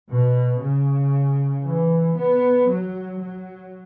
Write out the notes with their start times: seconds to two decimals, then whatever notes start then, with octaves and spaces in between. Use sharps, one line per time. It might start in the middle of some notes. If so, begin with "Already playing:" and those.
0.09 B2
0.61 C#3
1.64 E3
2.16 B3
2.68 F#3
3.19 F#3